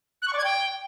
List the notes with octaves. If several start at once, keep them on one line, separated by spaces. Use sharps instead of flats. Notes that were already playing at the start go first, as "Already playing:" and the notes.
F#6
C#6
D5
G#6
G5